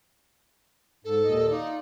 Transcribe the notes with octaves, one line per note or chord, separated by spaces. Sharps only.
G#2 A4
D#2 A#2 D#5
D#4 F4 D5